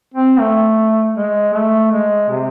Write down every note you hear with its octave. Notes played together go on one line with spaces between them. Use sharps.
C4
A3
G#3
A3
G#3
C3